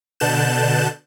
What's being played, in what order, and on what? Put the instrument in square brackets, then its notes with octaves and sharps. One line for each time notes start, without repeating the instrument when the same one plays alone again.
[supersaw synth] B2 D3 A5 F#6 G6 E7